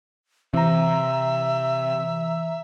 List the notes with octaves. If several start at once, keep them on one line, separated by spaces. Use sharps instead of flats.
C3 E3 E5 A#5